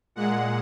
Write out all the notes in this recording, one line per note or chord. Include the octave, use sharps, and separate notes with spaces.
A#2 G#3 F#5